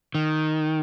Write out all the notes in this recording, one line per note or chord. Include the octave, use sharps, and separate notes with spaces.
D#3